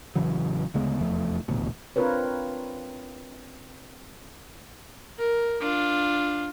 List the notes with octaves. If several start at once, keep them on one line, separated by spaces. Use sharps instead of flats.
A1 C#3 E3 F#3
D2 C#3 G#3 B3
F1 E2 F3 A3
D#1 A1 D2 B2
C4 D4 F4 A#4 B4 C#5
A#4
D4 F4